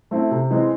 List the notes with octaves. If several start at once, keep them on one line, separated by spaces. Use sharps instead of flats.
A3 C4 E4
C3
E3 G#3 C4